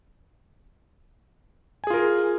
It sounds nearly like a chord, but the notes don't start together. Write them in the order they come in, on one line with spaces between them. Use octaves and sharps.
G#5 G#4 F4 A#4